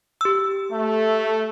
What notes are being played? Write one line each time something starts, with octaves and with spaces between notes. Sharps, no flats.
G4 E6
A3